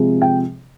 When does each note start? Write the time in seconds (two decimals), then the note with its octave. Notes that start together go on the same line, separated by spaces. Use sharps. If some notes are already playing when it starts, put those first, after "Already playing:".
Already playing: C3 F3 G#3
0.22 G5